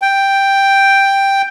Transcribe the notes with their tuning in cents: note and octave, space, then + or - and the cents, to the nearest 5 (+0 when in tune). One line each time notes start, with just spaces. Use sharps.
G5 +5